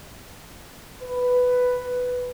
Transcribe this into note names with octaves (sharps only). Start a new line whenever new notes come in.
B4